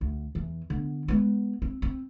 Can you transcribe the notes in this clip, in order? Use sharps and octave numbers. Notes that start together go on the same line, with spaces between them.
D2
E2 E3
D3 B3
G#3 B3
C4
C4